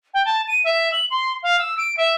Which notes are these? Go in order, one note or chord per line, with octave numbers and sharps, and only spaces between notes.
G5
A5
D#7
E5
F#7
C6
F5
E6
D7
E5